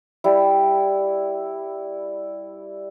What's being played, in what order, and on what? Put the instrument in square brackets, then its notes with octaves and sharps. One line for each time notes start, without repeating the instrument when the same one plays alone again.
[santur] G3 E4